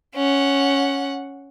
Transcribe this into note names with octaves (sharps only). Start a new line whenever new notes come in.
C#4 F#5